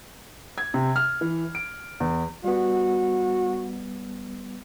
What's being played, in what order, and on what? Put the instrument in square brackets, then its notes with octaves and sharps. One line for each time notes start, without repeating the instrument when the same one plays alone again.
[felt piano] G#6
C3
F6
E3
D7
E2
[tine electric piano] G3 B3 [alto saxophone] F#4